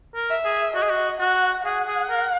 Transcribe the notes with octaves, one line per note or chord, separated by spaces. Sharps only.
A#4
E5
G#4
F#4 D#5
G#4
F#4
F#4 F#5
G#4 F#5
G#4
A#4